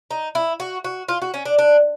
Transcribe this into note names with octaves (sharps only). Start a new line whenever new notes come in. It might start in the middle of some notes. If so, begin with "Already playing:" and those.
D#4
E4
F#4
F#4
F4
F#4
C#4
D4
D4